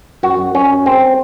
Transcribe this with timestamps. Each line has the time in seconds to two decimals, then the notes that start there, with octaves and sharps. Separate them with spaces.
0.23 F#2 F#4
0.39 F#2
0.55 F#2 C#4
0.70 F#2
0.86 G#2 C4